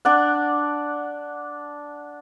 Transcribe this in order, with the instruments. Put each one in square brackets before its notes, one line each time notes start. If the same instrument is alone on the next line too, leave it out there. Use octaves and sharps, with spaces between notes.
[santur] D4 D5 F#5